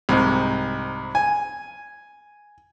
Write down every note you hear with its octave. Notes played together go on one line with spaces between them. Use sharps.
C2 G#2
G#5